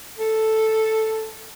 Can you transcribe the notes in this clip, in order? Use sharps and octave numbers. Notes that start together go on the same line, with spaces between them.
A4